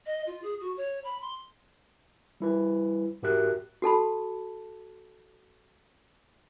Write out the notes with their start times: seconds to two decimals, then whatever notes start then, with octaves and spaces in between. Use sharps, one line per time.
0.06 D#5
0.27 F4
0.43 G#4
0.61 F#4
0.77 C#5
1.04 B5
1.21 C6
2.40 G3 E4 B4
3.23 G#2 F#4 G4 A#4 E5 F#6
3.82 F#4 A4 A5 B5